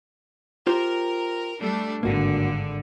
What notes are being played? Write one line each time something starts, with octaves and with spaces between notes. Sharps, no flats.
F4 G4 A#4 C5
G3 A3 D4
G#1 G2 D3 A#3 F#4